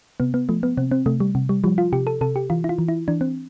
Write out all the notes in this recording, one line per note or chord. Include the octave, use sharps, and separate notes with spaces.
C3 B3
B3
F3 A3
B3
C3 C4
C4
C3 A3
G3
C3
G3
F3 G3
F4
C3 G4
A4
C3 A4
G4
E3 F4
E4
F4
E3
E4
E3 D4
C4